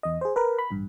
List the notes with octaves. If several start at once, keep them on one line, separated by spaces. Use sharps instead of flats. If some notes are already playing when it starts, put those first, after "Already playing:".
E2 D#5
G#4 C5
A#4 B4
B5
A1 G2